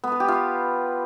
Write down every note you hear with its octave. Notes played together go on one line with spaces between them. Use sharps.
B3
B4
G4
F4